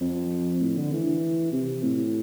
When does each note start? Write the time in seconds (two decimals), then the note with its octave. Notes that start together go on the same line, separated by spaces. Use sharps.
0.01 F2
0.61 A2
0.77 D3
0.92 E3
1.52 C3
1.82 A2